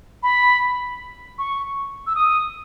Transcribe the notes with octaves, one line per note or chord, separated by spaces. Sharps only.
B5
C#6
E6
D#6